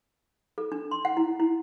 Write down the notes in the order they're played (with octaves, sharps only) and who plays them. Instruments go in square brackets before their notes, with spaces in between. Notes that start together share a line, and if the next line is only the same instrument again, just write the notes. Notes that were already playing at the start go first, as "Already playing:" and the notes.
[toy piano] A4
D4
C6
F#5
E4
E4